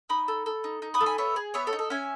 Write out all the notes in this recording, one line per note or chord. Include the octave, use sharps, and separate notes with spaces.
D#4 B5 D#6
A4
A4
D#4
D#4
B5 D#6
A4
G#5 B5
B3 C#5 E5
G#4
B3 C#5 E5
A4 C#5
D#4
A4
C#4 E5 G#5